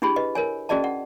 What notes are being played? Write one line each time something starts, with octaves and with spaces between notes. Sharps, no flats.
D4 E4 G4 G#4 B5
B4 D#5
A#4 C#5 G#5
C#4 F#4 G#4 D5 D#5 A5
F#5